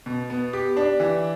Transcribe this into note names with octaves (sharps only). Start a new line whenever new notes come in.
B2
B3
G4
D4
E3